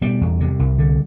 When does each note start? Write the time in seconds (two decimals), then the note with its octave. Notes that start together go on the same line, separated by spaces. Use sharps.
0.01 B2 G3
0.21 E2
0.40 C3
0.59 C2
0.78 D3